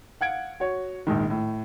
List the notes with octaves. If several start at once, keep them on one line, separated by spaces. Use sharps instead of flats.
F5 F#5 G#6 D7
F#4 C#5
A#1 G#2 D#3
A2